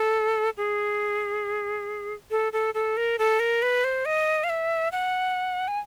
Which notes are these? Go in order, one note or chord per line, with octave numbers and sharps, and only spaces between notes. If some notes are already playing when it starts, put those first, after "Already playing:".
Already playing: A4
G#4
A4
A4
A4
A#4
A4
A#4
B4
C5
D#5
F5
E5
F#5
G#5